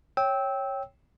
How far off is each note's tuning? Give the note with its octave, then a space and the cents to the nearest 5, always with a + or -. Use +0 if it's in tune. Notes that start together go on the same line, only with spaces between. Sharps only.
C#5 -10 G5 +0 E6 -20